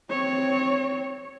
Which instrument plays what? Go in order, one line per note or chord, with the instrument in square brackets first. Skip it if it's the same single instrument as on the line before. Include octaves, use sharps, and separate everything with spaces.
[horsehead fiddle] C4 C#5